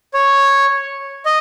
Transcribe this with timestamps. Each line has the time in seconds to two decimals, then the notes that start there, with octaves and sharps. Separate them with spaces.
0.14 C#5
1.25 D#5